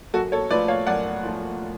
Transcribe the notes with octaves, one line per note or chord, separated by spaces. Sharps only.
F#2 F#4 A4
A4 C#5
F3 A3 F4 B4 D5
C#5 F5
F#2 D5 F#5
F3 A3 F4